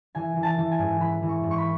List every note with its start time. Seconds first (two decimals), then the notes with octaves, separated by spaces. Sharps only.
0.15 E3 G#5
0.36 E3
0.43 A5
0.58 E3
0.72 G#5
0.79 G#2
1.00 E3 B5
1.23 E3
1.29 C#6
1.43 G#2
1.51 C#6
1.58 B5